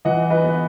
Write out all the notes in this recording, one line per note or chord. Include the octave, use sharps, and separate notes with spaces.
E3 D#5 F#5
B4 D#5
B3